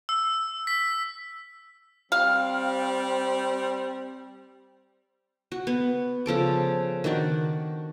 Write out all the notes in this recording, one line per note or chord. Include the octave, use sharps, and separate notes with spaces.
E6
B6
G3 C4 F5
F#4
B3
C#3 F3 A4 D6
D#3 D4 F#4 D5